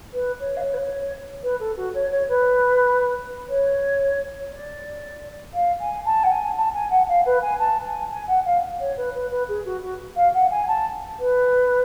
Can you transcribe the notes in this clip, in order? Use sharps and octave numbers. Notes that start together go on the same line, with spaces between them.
B4
C#5
F5
C#5
B4
C#5
B4
A4
F#4
C#5
C#5
B4
C#5
D5
F5
G#5
A5
F#5
G#5
A5
G#5
F#5
F5
B4
G#5
A5
G#5
G#5
F#5
F5
C#5
B4
B4
B4
G#4
F#4
F#4
F5
F#5
G#5
A5
B4